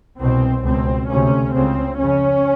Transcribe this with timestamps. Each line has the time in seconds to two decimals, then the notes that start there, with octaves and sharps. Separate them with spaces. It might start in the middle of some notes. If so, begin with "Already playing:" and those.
0.20 C2 B2 C4
0.64 C#2 B2 C4
1.09 D2 C3 C#4
1.54 C#2 C#3 C4
1.99 F2 C#3 C#4